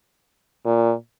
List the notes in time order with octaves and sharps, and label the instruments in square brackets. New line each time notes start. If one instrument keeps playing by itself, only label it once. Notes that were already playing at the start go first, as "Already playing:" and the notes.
[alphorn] A#2